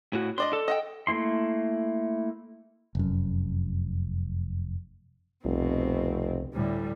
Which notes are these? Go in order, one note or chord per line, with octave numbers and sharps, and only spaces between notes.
A2 F#4
D4 D5 D#5 C6
A4
D#5 F#5 G5
A3 A#3 E4 C6
F1 F#2
F1 C2 B2 C4
D2 A2 G3